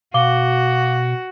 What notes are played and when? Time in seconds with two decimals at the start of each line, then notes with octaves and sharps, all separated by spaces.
0.14 B2 F#4 F5 D6 G7